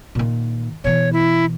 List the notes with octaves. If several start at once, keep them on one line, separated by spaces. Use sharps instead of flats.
A#2 D#3
B2 E3 C#5
E4